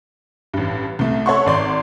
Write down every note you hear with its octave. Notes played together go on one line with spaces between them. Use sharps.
A1 G2
C2 A3
A4 C#5 E5 F#5 C6 C#6
G#1 D5 C6